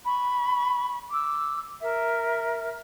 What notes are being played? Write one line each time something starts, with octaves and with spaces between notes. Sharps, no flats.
B5 C#6
D6 E6
A#4 E5